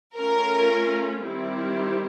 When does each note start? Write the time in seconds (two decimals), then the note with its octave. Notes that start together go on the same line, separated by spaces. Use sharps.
0.16 A3 C#4 F4 A#4
1.23 D#3 G3 C4 E4 G4